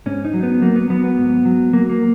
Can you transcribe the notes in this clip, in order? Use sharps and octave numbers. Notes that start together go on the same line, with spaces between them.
G#2 C#4
D#4
F#3
B3
F#3 A#3
B3
F#3 B3
B3
G#2
F#3
F#3 A#3
A#3